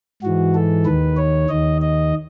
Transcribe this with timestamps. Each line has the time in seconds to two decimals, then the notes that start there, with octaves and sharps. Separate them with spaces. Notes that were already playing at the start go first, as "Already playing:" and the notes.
0.23 G#2 E3 F#4
0.55 A4
0.85 D#2 D#3 B4
1.17 C#5
1.49 D#2 D#3 D#5
1.81 D#5